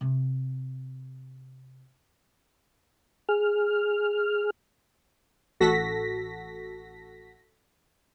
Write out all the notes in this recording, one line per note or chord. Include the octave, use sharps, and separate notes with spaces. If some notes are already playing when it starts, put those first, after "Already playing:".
C3 C4
G#4 F6
A1 F#4 A4 A#6 B6